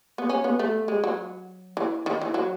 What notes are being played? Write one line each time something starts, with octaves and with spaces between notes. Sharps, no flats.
B3
C#4
B3
A3
G#3
F#3
E3
D#3
E3
F#3